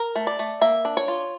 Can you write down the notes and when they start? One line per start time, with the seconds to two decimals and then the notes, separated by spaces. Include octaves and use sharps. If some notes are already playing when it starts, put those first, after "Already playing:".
Already playing: A#4
0.16 A3
0.27 D5
0.39 A3
0.61 A#3 E5
0.85 D4
0.97 C#5
1.08 F4